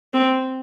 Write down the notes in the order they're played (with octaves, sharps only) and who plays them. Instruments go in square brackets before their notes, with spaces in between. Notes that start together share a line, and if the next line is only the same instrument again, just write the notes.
[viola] C4